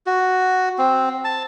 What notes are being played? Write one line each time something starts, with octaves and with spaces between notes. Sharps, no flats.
F#4
C4
A5